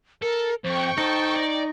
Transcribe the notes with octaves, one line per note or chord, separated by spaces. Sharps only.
A4 A#4
F2 C5 G5 C#6
D#4 A4 C5
D5